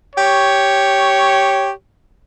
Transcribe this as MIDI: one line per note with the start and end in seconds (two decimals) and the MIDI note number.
0.16 1.68 67
0.16 1.68 73